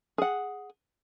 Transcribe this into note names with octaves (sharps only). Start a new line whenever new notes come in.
G#4 F#5